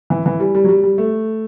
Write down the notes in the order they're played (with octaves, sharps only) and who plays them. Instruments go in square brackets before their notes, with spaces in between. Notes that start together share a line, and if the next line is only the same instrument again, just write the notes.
[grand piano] E3
E3
G3
G3
F#3
G3
G3
A3